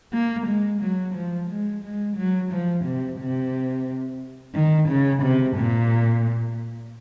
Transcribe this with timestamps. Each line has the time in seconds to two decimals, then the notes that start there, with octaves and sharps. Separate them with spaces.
0.13 A#3
0.47 G#3
0.82 F#3
1.15 F3
1.50 G#3
1.84 G#3
2.17 F#3
2.52 F3
2.85 C3
3.20 C3
4.55 D#3
4.89 C#3
5.23 C3
5.57 A#2